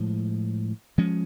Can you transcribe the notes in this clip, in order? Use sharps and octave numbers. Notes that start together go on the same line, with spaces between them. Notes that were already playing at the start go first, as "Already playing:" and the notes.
Already playing: A2 F3 G#3
F3 G#3 C#4